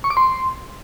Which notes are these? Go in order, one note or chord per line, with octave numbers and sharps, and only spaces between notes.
C#6
D6
C6